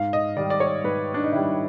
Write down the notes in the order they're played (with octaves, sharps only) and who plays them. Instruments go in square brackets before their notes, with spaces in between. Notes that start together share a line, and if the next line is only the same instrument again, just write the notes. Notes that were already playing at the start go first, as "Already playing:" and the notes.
Already playing: [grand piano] G#2 F5
D#5
D#3 G3 D5
D5
C#5
G#2 B4
D4
D#4
D#3 G3 E4